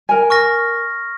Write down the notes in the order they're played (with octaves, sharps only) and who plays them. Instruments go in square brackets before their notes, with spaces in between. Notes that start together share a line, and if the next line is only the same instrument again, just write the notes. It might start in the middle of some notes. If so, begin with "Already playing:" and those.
[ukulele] A#4 G#5
[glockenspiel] C#6 F6 A#6